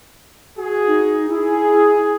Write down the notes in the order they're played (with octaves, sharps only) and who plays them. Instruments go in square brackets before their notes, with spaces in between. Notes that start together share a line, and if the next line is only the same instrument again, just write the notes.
[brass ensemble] F#4 G#4
[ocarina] D#4
[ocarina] E4 [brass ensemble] G#4